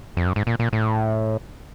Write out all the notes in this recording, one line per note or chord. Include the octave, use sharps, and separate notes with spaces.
F2
F#2
G#2
A#2
A#2
A2